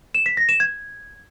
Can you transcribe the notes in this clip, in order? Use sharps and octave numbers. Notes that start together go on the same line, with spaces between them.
E7
B6
A#6
E7
G#6